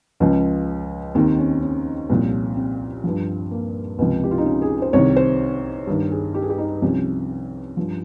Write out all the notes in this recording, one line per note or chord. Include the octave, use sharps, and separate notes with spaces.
C#2 C#3 F3 C#4
D#2 D#3 C4
C#4
C#4
C2 A#2 F3
C4
G2 F3
A#3
C#2 C3 F3
G4
F4
D#4
C#4
G#4
C5
C2 C3 D#3 C#5
C5
G2 D#3
G#4
G4
G#4
G4
D#4
C2 C3 F3 C#4
G2 F3